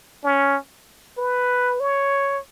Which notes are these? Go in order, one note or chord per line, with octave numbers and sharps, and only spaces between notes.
C#4
B4
C#5